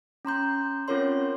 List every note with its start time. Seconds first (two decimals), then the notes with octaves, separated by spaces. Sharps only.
0.25 C#4 A#5 C6 G6
0.88 C4 C#4 F4 A#4 C#5 C6